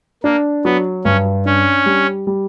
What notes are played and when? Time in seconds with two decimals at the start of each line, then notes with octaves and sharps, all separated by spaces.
0.24 A#3 D4
0.65 F#3 B3
1.04 G2 C#4
1.46 C#4 D4
1.86 G3
2.27 G3